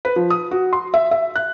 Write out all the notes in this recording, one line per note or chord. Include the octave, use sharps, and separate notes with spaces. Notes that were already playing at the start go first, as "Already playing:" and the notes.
B4
F3
D#6
F#4
C6
E5
E5
F#6